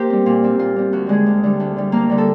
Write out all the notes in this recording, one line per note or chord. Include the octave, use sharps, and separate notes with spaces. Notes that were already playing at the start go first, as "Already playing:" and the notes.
Already playing: A#3 G4 A#4 C5
G3 C4
A#2 F4
G3 C4
A#2 F4
G3 C4
D2 F#4
D3 G3 G#3 G#4
D2
D3 G3
D2
D3 G3
D2 A#3 A#4
D3 G3
A4